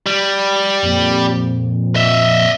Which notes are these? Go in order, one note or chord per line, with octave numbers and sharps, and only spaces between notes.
G3
F2 A#2
D#5 E5